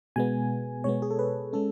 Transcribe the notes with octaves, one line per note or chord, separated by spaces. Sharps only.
B2 G#3 B3 G#5
B2 G#3 B3 C#5
G#4
A4
B4
G#3 C#4 A4